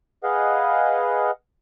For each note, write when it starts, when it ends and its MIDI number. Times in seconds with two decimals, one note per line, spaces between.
0.23 1.31 68
0.23 1.31 71
0.23 1.31 75
0.23 1.31 77
0.23 1.31 78